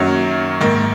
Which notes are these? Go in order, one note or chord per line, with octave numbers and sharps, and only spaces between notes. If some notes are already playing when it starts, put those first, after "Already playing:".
Already playing: F#2 D#3 F#3 A#3 C#4
G#2 D#3 A#3